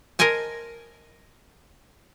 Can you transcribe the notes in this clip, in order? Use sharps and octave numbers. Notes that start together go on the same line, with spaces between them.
A#4 C5 D#5 G#5 A5